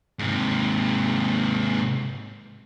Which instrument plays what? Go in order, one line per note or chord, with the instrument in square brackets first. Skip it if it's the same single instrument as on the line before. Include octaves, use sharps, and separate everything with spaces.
[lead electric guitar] G#2 C3